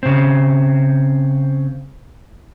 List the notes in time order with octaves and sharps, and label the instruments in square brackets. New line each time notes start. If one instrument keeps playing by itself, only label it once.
[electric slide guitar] C#3 C4